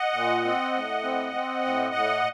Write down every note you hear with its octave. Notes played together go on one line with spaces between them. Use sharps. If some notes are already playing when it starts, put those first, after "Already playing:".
Already playing: D#5 F#5
A#2
C4
A2
C4
C4
A2
A2